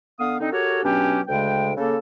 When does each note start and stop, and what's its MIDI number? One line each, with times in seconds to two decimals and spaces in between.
0.18 0.35 50
0.18 0.35 59
0.18 0.35 77
0.18 0.35 87
0.39 0.51 50
0.39 0.51 60
0.39 0.51 63
0.52 0.83 66
0.52 0.83 67
0.52 0.83 69
0.52 0.83 70
0.52 0.83 73
0.83 1.21 47
0.83 1.21 54
0.83 1.21 61
0.83 1.21 62
0.83 1.21 67
1.28 1.71 38
1.28 1.71 49
1.28 1.71 56
1.28 1.71 79
1.76 1.96 49
1.76 1.96 58
1.76 1.96 69